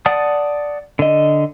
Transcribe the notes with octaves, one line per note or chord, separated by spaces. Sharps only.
D5 F#5 A5 D#6
D3 D#5